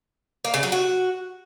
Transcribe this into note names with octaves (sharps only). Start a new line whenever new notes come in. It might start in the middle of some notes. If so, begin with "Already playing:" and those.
A#3
C#3
F#3
F#4